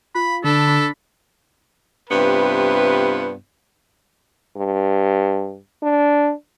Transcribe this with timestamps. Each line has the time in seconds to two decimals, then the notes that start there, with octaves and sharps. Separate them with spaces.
0.15 F4 B5
0.44 D3 D4 A4 B5
2.10 G2 C3 B3 F4 B4
4.57 G2
5.83 D4